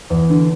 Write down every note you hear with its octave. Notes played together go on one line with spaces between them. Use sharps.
E2
D3